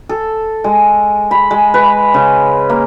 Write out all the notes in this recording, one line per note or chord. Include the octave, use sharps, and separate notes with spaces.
A4
G#3
B5
G#3
B4
C#3
A#3